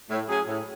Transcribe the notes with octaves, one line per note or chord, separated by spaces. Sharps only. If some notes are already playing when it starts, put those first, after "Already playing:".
A2
F#3 C#4 G#4
A2